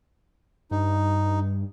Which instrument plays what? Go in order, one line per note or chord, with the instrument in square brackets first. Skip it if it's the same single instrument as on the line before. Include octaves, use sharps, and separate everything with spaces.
[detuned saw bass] G2 [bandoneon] D#4